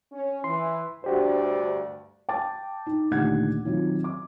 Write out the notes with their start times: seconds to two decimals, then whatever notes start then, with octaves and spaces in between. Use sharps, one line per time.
0.12 C#4
0.44 E3 C6
1.04 D2 G2 F#4 G4 C5 D5
2.29 G5 A5 D6 A6
2.86 D#4
3.11 D2 A#2 D#3 G4 F#5 G#6
3.65 D#3 F#3 C4 D#4 F4
4.04 D6